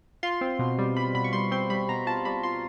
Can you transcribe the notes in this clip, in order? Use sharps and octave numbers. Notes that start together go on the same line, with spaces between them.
F4 C6
C4
B2
G3
G3 B5
B2 B5
C#6
G3 C6
C4 C6
G3 B5
B2 A#5
F4 A5
G3 B5
F4 C6